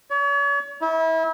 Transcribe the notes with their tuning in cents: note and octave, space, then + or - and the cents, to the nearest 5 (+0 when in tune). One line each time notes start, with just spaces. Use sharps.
C#5 +40
E4 -30